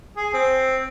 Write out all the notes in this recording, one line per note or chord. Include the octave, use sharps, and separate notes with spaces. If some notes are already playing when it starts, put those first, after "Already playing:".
G#4
C4